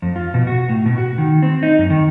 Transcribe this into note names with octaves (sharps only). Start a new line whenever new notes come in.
F2
F4
B2
F#4
A2
B2
F#4
D#3
C4
D#4
F#2
D#3